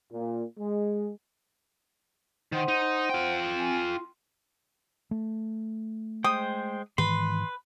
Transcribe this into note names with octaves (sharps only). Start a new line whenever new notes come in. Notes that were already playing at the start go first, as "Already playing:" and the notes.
A#2
G#3
D#3 C5 F#5 C6
D#4
F4 G5
C4 G#5
C6
A3
G#3 C5 G5 D#6
G#2 D#3 E3 B4 C6